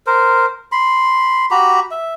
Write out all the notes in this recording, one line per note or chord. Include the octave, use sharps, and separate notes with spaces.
A#4 C5
B5 C6
F#4 G4 A#5 B5
E5